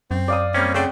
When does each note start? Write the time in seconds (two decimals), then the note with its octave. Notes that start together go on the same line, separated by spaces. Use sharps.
0.11 F#2 C4
0.28 D5 F5 D#6
0.54 G3 A#3 C4 C#4
0.75 C#3 A3 C4 C5 D5 F#5